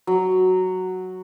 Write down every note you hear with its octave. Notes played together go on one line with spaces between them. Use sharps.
F#3